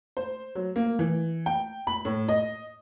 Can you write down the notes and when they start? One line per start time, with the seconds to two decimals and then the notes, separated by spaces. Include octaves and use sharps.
0.17 C5
0.55 F#3
0.76 A#3
0.99 E3
1.46 G5
1.87 B5
2.05 A2
2.28 D#5